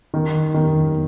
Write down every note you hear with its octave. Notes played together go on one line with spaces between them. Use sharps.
D#3
D#3